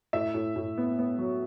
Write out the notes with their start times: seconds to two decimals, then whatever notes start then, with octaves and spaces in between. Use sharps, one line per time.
0.13 A2 E5
0.34 A2
0.56 A2
0.77 B3
0.99 B3
1.19 F#3